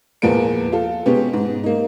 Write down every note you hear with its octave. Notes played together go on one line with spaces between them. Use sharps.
E2 A#2 F3 A#3 B4 D7
F4 A4
B2 G#3 B3 C#4 G4
G#2
A#3 D#4